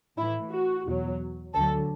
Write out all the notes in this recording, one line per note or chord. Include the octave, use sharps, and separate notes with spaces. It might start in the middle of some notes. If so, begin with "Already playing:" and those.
A2 E3 E4
F#4
E2 B2 F#3
D2 D3 F#3 A4